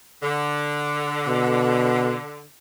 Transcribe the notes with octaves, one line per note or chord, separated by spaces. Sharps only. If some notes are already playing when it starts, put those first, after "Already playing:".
D3
B2